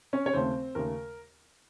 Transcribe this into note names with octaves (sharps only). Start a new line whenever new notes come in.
C#4 C#5
C#5
D#2 C#3 A3 C4 C5
D#2 C#3 A3 A#4